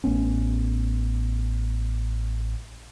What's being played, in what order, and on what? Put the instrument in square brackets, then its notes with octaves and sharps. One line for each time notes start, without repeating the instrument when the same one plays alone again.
[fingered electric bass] A1 A3 B3 C#4